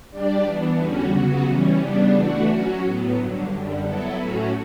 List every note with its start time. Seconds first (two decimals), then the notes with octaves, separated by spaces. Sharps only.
0.10 G3 D4 G4 D5
0.44 E3 B3 D4
0.77 E2 D3 G3 C#4 F#4
1.11 C#3 F#3 B3 F#4
1.45 E3 G3 C#4
1.79 C#3 G3 B3 D4
2.13 E3 A3 D4 F#4
2.47 F#3 C#4 F#4
2.81 A2 F#3 B3
3.14 G2 D3 F#3
3.49 F#2 D3 G3
3.82 F#3 B3 E4 A4
4.16 A2 F#3 A3 C#4 F#4